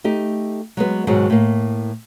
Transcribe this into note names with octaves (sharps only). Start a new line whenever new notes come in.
A3 D#4 G4
F#3 G#3 B3
G#2 B2 D#3 F#3 G#3
A2 A#3